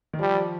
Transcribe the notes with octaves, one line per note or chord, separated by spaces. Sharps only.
D#3
F3 G3